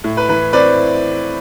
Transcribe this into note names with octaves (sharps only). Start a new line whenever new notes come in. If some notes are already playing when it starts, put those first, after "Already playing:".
A2
B4
E3 B4
C4 B4 D5